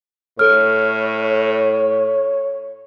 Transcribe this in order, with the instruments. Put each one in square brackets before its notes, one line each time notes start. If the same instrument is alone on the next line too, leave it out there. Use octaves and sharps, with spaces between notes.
[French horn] A2 [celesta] A4 F6 [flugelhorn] C#5